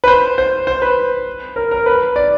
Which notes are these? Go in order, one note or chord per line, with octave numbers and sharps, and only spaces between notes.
B4
C5
C5
C5
B4
A#4
A#4
B4
D5